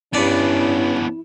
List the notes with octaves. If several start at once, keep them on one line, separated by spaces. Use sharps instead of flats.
G2 B3 C#4 D4 E4 D5